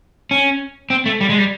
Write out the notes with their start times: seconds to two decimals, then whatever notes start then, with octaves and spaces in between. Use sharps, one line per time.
0.31 C#4
0.90 C4
1.06 A3
1.21 G3
1.29 G#3
1.38 G3